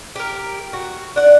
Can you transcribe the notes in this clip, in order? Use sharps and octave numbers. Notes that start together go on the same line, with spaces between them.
G4 A#4
F#4
D4 F#5